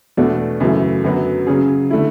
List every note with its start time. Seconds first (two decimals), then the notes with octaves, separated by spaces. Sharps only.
0.17 E2 B2 A3 D4 F#4
0.60 F#2 C#3 E3 A3
1.04 F#2 D3 F#3 B3 F#4
1.47 C#3 F#3 C#4 G#4
1.90 D3 A3 E4